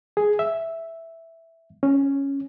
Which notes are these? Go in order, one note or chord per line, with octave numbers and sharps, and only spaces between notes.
G#4
E5
C#4